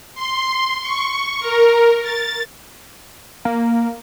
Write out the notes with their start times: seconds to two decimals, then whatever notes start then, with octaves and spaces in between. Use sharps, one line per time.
0.15 C6
0.81 C#6
1.40 A#4
2.02 A6
3.45 A#3